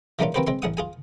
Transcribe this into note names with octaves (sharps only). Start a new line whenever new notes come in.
E3 G#3 A#3 C#4 D4 F4
A#3 C4 F#4 G4 B4 C5
G#3 C4 C6
A1 G#4 F#5 D#6
F4 G#4 G#5